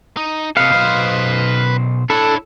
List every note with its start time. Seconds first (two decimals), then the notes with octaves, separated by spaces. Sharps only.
0.17 D#4
0.57 C3 A4 B4 D#5 F5
0.72 B1 C5
2.10 D4 E4 A4 C#5